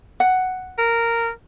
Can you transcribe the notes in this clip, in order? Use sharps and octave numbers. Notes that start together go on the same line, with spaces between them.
F#5
A#4